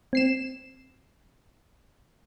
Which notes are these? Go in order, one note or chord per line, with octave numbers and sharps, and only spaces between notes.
C4 C7 E7